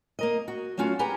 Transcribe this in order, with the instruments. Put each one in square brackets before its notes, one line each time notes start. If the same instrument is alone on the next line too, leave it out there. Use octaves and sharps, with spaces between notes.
[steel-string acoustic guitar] A#3 A#4 D#5
F#4
F#3 A3 C#4 F4 F#4
G4 G#4 B4 F#5 G#5 A#5